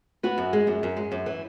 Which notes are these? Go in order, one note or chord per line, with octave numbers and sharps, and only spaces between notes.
B3 F#4
F#2
G#3
F#2
F#2
G#3
F#2
E3